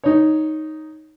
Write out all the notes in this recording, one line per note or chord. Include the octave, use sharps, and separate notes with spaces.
D#4 C#5